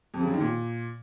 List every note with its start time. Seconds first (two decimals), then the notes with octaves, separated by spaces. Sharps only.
0.14 F2
0.20 C#3
0.27 F#2
0.34 D#3
0.40 A#2